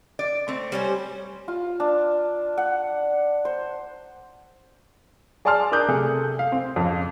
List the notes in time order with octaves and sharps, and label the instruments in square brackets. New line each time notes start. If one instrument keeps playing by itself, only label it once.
[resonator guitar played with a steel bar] D5
A3 C4
[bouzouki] G3 C#4 C5
[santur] F4
D4
F#5
C5
[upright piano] G#4 D5 G#5 A5 C6 F6
D4 A#4 D6 D#6 F#6 G6
C3 A3 G#4 A4
F5
C4
F2 C#3